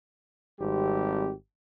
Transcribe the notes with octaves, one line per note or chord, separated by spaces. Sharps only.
G#1 G3 C4 G4